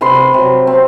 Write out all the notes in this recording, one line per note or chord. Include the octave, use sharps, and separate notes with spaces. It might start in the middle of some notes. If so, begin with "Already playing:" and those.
C3 B4 C6
B4
C3 F#3
C4